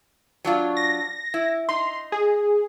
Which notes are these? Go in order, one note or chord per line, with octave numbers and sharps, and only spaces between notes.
F#3 D4 F4
A#6
E4
D#4 C6
G#4